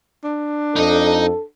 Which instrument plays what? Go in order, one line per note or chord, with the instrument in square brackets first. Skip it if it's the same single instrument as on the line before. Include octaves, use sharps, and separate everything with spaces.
[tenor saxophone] D4
[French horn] F2 [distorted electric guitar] D#4 D#5 [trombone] A4